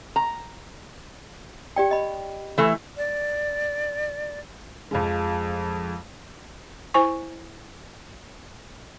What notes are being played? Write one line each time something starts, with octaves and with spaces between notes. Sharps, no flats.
A#5
G4 D5 G5
D#5 B5
E3 A3 E4
D5
F2 F3 G#3
E4 C5 G#5 C#6